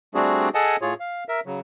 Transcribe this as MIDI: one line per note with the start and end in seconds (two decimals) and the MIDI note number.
0.14 0.49 55
0.14 0.49 57
0.14 0.49 60
0.14 0.49 62
0.14 0.49 66
0.14 0.49 68
0.54 0.76 68
0.54 0.76 69
0.54 0.76 75
0.54 0.76 78
0.54 0.76 80
0.54 0.76 81
0.81 0.94 45
0.81 0.94 65
0.81 0.94 68
0.81 0.94 73
1.00 1.24 77
1.29 1.40 70
1.29 1.40 76
1.46 1.60 49
1.46 1.60 54